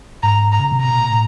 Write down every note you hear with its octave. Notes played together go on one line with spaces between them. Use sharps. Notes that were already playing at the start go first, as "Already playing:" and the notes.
G#2 A#5
A#5
C#3
C3
B2 A#5
A#2
A2